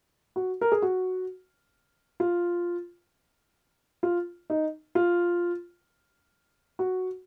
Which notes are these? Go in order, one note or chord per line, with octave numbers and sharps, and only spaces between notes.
F#4
A#4
G#4
F#4
F4
F4
D#4
F4
F#4